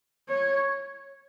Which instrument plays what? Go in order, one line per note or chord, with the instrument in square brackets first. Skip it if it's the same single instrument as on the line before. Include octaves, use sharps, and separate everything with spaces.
[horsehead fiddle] C#5